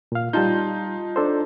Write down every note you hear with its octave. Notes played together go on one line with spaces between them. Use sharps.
A#2 F5
G3 D#4 F4 A5 G6
D4 A4 C5